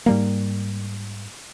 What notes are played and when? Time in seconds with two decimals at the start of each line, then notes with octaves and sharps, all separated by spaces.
0.06 G#2 G3 A#3